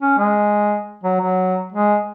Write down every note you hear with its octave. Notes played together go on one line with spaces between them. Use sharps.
C#4
G#3
F#3
F#3
G#3